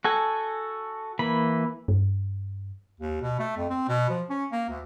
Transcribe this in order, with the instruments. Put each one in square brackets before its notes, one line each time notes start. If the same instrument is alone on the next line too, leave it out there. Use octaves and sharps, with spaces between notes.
[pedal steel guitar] F#4 A4 G#5
E3 A#3 B5
[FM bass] G2
[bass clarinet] D#2
B2
A3
F2
C4
B2
F3
C#4
A#3
D2